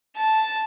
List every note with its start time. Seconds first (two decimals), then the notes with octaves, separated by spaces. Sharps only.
0.17 A5